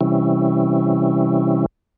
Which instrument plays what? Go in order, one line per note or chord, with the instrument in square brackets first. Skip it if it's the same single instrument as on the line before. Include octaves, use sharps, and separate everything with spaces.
[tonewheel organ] C3 E3 G3 C#4 E4